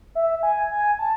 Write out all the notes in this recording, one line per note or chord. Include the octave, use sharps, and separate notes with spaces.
E5
G#5
G#5
A5